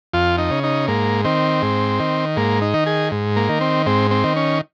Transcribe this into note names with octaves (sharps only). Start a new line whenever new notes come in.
F2 F4
D#4
C#3
D#4
G#2 A#3
D#3 C4
G#2
D#3
G#2 A#3
D#4
D#3
G#4
G#2
A#3
D#3
C4
G#2 C4
C4
D#3
C#4